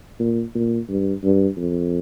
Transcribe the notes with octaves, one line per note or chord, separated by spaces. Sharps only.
A#2
A#2
G2
G2
F2